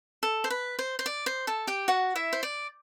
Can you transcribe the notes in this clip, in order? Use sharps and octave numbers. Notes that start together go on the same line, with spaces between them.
A4
C5
B4
C5
C5
D5
C5
A4 A5
G4 G5
F#4 F#5
E4 E5
C5
D5